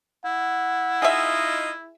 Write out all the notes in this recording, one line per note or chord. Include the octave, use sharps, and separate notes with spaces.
E4 F#5
D#4 F4 G#4 D#5 E5